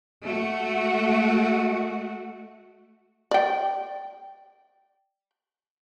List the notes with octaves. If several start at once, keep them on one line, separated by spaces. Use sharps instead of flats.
A3 F#4
D5 G5